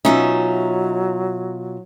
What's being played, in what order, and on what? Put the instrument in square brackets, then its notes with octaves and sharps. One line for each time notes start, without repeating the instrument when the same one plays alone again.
[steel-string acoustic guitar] B2 F4 E5 [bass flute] F#3 [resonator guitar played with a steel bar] C#4 D#4